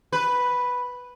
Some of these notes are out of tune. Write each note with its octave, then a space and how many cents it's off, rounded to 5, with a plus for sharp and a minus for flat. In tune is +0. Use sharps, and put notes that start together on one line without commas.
B4 +0